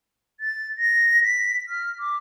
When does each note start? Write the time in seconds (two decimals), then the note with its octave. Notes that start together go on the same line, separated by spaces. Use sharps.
0.40 A6
0.78 A#6
1.24 B6
1.69 F6
2.00 D6